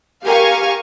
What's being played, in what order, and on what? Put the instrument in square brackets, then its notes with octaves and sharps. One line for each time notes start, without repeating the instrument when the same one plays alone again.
[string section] G4 A#4 F5 G#5 C#6